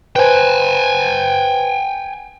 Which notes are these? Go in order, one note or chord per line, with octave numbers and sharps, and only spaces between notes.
B4 C5 G5 G#5